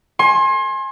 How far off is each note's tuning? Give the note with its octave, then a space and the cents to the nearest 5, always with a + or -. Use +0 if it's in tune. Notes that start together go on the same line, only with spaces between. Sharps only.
G#5 +10 C6 +35